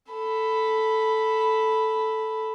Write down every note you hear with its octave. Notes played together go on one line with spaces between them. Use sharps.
A4 B5